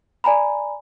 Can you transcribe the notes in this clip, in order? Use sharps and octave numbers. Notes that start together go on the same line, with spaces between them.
D5 G#5 A#5 B5